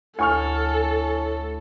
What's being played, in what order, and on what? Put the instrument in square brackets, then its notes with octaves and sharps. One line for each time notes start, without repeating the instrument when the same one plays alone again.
[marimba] D2 [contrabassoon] A2 [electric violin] A4 [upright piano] G#5 C#6 F6